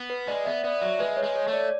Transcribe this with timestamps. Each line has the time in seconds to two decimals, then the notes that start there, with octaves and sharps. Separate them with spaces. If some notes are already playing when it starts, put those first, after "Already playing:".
Already playing: B3
0.10 B4
0.27 G#3 D5
0.45 B3 E5
0.64 B3 D5
0.82 F#3 E5
0.99 G#3 B4
1.17 C#5
1.23 G#3
1.36 C#5
1.48 A3
1.53 D5